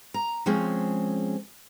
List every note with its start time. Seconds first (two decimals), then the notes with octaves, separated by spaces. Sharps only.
0.14 A#5
0.46 F3 G#3 C4 C#4 G#4